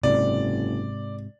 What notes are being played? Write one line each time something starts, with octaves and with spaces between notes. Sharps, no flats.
F#1 G#2 C3 D5